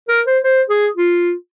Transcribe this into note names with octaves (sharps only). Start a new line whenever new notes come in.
A#4
C5
C5
G#4
F4